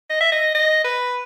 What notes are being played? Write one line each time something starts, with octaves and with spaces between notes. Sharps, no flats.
D#5
E5
D#5
D#5
B4